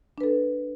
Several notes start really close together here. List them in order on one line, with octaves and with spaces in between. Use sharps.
D4 B4 A4